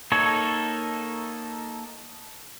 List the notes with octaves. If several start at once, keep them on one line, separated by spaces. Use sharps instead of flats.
A#3 D#4 A4 C#5